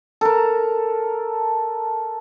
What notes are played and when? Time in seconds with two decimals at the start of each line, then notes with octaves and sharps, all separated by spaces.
0.21 A4 A#4